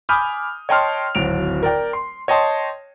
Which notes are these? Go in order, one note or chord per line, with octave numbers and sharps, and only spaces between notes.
G#5 B5 D6 D#6 F6 G6
C#5 D#5 G5 A5 C6 F6
D1 G#1 F#3 D7 F7
A#4 D5 G5
C6
C#5 D#5 G5 A5 C6